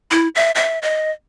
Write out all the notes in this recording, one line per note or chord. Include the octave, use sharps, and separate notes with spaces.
E4
E5
E5
D#5